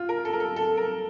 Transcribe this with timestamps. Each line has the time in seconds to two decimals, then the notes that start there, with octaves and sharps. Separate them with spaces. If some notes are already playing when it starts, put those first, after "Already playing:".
Already playing: F4
0.09 A#4
0.25 A4
0.33 A#4
0.40 A4
0.56 A4
0.77 A#4